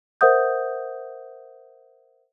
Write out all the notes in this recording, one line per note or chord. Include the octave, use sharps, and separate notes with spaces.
A#4 C5 E5 F#5 D#6 G6